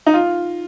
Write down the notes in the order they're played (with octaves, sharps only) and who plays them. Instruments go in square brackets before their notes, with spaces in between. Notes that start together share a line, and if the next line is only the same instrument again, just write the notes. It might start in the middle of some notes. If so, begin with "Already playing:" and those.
[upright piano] D#4
F4